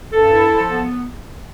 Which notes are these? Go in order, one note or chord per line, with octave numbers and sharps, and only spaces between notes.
G2 A4
E4
F3
B3